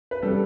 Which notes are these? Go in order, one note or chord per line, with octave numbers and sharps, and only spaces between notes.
B4
G3 A4